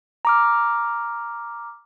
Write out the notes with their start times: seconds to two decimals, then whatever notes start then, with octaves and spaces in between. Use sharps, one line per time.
0.25 A#5 D6 F6